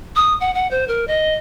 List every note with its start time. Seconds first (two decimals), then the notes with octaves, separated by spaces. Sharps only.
0.16 D#6
0.40 F#5
0.54 F#5
0.71 C5
0.88 A#4
1.08 D#5